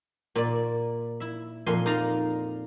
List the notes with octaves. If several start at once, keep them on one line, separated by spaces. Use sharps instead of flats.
A#2 D5
E4 E5
F2 A#2 D#5 G#5 C6
D#4 D5 F5 A#5